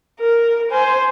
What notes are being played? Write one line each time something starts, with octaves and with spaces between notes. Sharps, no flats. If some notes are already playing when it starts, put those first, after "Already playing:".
A#4
C5 G#5